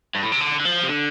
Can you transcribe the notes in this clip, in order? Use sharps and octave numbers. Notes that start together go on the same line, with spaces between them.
G2
A2
C3
D3
D3
F3
C3
D3